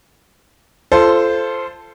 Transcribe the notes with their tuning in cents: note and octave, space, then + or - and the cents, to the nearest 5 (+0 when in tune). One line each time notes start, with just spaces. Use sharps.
F4 -25 A4 +0 C5 +0